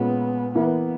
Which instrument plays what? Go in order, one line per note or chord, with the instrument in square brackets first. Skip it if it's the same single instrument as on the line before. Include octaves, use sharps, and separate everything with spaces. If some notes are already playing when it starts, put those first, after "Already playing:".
Already playing: [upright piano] A#2 G#3 C#4 [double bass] B3
[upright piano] E3 A#3 E4 [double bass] B3